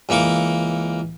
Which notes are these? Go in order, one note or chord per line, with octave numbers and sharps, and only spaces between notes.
C#2 E3 A#3 C#6 D6